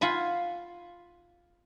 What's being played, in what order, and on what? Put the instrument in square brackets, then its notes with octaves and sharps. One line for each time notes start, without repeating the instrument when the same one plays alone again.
[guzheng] F4 F#5 G#5 B5